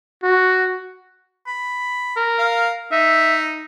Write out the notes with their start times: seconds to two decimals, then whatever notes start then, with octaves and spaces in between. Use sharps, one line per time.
0.23 F#4
1.47 B5
2.17 A#4
2.39 F5
2.92 D#4 E5